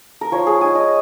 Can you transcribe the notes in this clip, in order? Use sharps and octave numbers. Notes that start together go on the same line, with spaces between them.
A#4
F3 C#5
G#4
G#3 D#4 G#5
D#5